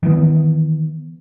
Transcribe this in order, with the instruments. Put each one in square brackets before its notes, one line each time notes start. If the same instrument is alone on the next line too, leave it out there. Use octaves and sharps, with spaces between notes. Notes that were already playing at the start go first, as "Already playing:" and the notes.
[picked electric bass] D#3 E3 G3 B3